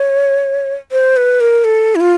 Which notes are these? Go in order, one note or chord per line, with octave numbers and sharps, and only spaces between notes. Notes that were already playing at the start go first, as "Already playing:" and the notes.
Already playing: C#5
C5
B4
A#4
A4
E4
F4